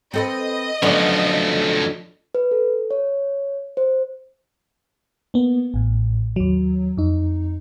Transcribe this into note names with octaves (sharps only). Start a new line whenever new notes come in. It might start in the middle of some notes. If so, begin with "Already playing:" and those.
C4 A4 B4 D#5
D3 F3 F#3 A3 B3 C#4 D5
B4
A4
C#5
C5
A#3 B3
A1 A2
D#2 F#3
F2 D#4